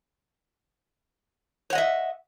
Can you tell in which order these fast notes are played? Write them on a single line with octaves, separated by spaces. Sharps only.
C#5 F#5 D#5 E5